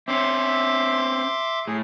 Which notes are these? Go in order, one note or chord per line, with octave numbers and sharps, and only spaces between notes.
C4 C#4 E5 C6 D6
A2 G#4